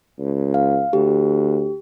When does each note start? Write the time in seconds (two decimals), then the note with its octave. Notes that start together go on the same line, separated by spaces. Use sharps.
0.19 C#2
0.54 F5
0.93 D2 G4